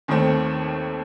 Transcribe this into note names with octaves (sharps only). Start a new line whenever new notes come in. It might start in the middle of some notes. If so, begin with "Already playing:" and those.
D#2 D#3 A3 C4